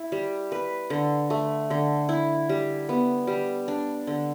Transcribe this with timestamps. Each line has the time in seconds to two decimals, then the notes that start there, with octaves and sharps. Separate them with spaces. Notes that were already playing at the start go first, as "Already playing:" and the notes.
Already playing: E4
0.12 G3
0.52 B4
0.90 D3
1.30 A3
1.70 D3
2.09 E4
2.49 G3
2.89 B3
3.27 G3
3.68 D4
4.07 D3